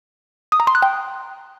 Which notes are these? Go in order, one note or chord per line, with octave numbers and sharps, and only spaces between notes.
D#6
A#5
C6
F#6
G5